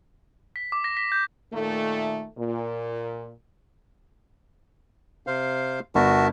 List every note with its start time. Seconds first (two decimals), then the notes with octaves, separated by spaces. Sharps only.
0.56 B6
0.72 D6
0.84 A#6
0.97 B6
1.12 G6
1.52 A#2 D#3 A3
2.37 A#2
5.27 C3 C5 F5
5.95 G1 F#4 A#4 E5 A5